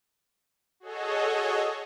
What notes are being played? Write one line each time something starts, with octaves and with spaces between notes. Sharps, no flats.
F#4 G#4 A4 C#5 D#5